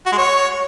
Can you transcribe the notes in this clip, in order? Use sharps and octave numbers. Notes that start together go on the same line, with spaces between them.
F#4
G#3
C#5